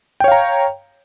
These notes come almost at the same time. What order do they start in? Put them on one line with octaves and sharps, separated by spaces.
G5 C#5 F5 A#5